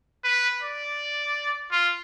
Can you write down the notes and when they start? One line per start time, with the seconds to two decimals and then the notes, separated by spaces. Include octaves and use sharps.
0.24 B4
0.62 D5
1.72 F4